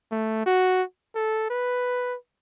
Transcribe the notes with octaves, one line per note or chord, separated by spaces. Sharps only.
A3
F#4
A4
B4